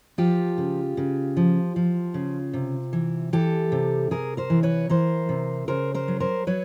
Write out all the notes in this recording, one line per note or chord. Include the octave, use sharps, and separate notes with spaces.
F3 F4 G4
C#3
C#3
F3
F3
C#3
C3
E3
E3 G4 A4
C3
C3 G#4 A#4
A#4 C5
E3
B4 C#5
E3 A#4 C5
C3
C#3 A#4 C5
A#4 C5
F#3
A#4 C5
F#3 B4 C#5